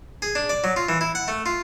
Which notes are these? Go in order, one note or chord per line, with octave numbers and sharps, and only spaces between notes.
G#4
D4
D5
F#3
F4
E3
E4
F#5
A3
F4